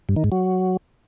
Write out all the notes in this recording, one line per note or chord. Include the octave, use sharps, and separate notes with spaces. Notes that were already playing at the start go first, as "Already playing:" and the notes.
G2
D#3
G#2
F#3